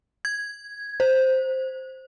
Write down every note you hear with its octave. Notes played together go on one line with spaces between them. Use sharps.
G#6
C5